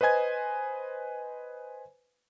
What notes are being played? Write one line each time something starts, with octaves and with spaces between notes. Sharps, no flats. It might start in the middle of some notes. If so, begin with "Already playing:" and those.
B4 C5 D#5 G#5 G#6